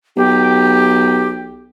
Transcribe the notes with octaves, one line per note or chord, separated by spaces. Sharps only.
B1 G4